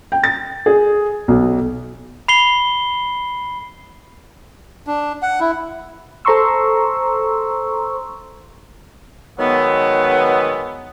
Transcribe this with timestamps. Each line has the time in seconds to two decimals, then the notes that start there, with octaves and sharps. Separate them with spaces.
0.12 G5
0.24 A6
0.66 G#4
1.28 B1
2.28 B5 C7 G7
4.87 D4
5.22 F#5
5.40 E4
6.25 A4 C5 A#5 C6 C#6 E6
9.39 D#3 F#3 G#3 A3 B3